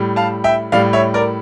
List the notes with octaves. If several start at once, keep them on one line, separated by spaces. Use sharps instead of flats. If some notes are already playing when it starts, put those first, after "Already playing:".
Already playing: A2 G3
F5 A5
E5 G5
A2 G3 D5 F5
C#5 E5
A#4 D5